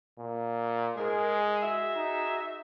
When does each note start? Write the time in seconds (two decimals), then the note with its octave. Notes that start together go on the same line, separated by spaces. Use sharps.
0.19 A#2
0.97 G#2 G#3 G#4 A#4
1.63 F#4 G#4 E5
1.96 D#4